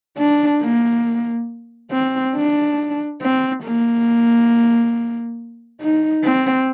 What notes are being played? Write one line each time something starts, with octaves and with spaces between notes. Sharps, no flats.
D4
A#3
C4
D4
C4
A#3
D#4
C4